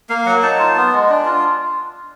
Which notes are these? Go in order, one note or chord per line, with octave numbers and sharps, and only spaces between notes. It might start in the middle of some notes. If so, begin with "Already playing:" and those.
A#3 F5
F#3 F#5
D#4 A5
F4
B3
G#3
D4
F4